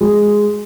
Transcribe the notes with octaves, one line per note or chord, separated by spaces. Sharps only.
G#3